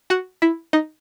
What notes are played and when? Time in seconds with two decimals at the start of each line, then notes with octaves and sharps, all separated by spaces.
0.10 F#4 F#5
0.42 E4 E5
0.73 D#4 D#5